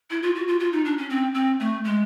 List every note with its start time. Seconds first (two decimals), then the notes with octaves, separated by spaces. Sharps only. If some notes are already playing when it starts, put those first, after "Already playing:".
0.11 E4
0.23 F4
0.35 F#4
0.48 F4
0.60 F4
0.73 D#4
0.85 D4
0.98 C#4
1.10 C4
1.34 C4
1.60 A3
1.84 G#3